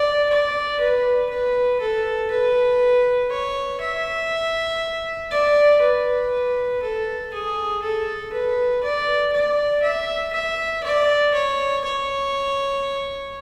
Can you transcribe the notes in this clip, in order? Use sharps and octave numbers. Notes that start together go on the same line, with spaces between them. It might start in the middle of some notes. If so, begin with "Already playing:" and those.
Already playing: D5
D5
B4
B4
A4
B4
C#5
E5
D5
B4
A4
G#4
A4
B4
D5
D5
E5
E5
D5
C#5
C#5